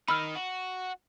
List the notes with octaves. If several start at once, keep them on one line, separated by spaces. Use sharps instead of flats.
D#3 D#4 B5 E6 F6
F#4